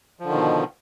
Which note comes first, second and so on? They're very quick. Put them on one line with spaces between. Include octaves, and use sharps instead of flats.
F3 D3 D#3 B2